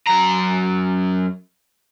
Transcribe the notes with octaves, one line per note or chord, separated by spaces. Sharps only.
F#2 A#5